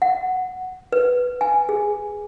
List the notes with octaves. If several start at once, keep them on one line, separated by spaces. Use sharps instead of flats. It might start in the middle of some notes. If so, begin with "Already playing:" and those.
F#5
B4
G#5
G#4